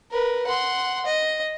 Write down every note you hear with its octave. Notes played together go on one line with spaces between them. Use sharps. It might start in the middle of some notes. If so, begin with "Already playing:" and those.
A#4 B4
F#5 C6
D#5